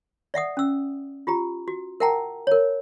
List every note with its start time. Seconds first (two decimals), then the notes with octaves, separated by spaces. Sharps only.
0.34 D5 E5 F#5 D#6
0.57 C#4 E6
1.27 F4 G4 A#5
1.68 F#4
2.00 A#4 E5 F#5 G5 A5 A#5
2.47 A#4 C#5